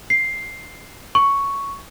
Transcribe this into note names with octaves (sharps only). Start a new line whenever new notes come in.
C7
C#6